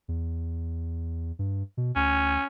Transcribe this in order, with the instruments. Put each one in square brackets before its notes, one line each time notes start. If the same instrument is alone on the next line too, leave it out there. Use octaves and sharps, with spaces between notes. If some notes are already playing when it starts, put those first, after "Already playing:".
[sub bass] E2
G2
B2
[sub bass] D2 [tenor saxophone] C#4